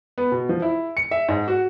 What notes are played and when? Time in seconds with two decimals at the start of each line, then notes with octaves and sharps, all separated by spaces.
0.18 B3
0.32 B2
0.49 F3
0.62 E4
0.97 C#7
1.11 E5
1.29 G#2
1.48 F#4